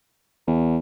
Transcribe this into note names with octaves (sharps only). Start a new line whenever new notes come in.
E2